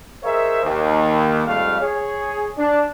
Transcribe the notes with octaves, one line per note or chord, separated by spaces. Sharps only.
G#4 A#4 C5 C#5 D#5 E5
D#2
F2 G#2 F3 G3 A3 F5
G#4 C#5
D4